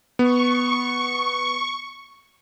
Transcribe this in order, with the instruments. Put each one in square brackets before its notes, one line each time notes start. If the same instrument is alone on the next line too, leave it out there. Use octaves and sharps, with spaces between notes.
[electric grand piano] B3 [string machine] C#6